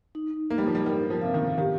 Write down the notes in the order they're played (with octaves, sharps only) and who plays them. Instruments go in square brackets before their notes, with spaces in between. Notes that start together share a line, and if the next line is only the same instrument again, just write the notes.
[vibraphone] D#4
[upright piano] A#3 [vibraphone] D#4
[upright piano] G3
F3
G3
[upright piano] G3 [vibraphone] A#4
[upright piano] F3
[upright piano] C3 [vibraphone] F5
[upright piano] D#3
[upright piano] D#3 [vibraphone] G4